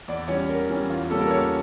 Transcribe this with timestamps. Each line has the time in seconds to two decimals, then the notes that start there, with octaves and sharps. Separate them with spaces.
0.08 E2 D5
0.28 E3 G3 C#4 C#5
0.49 E2 A#4
0.70 E3 G3 C#4
0.90 E2 F4
1.10 C#3 G3 A#3 C#4 A4
1.21 A#4
1.30 E2 C#5